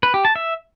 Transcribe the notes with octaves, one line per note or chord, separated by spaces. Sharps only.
B4
G4
A5
E5